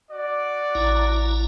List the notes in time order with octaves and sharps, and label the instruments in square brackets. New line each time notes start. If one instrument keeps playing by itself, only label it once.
[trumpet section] F#4 D5
[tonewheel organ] A1 E4 A#5